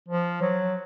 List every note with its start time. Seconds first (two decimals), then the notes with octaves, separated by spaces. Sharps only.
0.08 F3
0.41 F#3